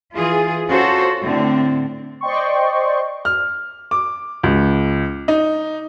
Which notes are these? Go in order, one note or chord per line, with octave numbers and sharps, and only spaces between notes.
E3 F4 G#4
C#4 F4 F#4 A4 C5
A2 D3 C4
C5 D5 D#5 G5 C6 C#6
F6
D6
C#2
D#4